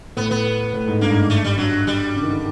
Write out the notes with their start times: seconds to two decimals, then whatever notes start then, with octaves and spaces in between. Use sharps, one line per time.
0.17 A2 B3
0.31 B3
0.73 A2
0.87 G#2
1.01 G2 A#3
1.10 G#2
1.19 G2
1.30 A3
1.44 G3
1.58 G2 F#3
1.87 G3
2.15 C#3
2.23 D#3
2.29 D3